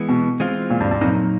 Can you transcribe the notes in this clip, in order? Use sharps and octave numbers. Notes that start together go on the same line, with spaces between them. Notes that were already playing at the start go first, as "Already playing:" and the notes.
Already playing: E3 G#3 B3
B2
E3 G#3 C4 F4
A#2
G2
G2
F2 A#2 F#3 A#3 D#4